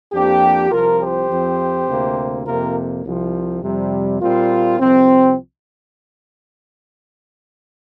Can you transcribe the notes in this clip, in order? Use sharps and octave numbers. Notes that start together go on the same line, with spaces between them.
F2 F3 A#3 D4 G4
C2 C3 F3 F4 A#4
G4 C5
F2 F3 C4
D2 C3 A#3
F2 C3 A#3 F4 A#4
C2 C3 F3
F2 C3 G3
A#2 G3 A#3 C4 F4
C2 C3 F3 C4